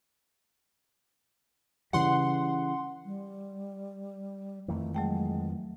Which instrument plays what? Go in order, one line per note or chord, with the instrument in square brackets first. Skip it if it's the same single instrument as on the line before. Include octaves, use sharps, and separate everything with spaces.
[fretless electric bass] C#3 E3 G3 [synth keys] F#5 C6
[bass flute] G3
[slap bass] F2 D#3 E3 [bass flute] A3
[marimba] F#3 A3 G5 [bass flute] G#3